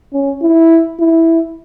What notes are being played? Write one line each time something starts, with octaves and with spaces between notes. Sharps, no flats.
C#4
E4
E4